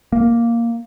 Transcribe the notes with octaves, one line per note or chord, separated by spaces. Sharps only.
A#3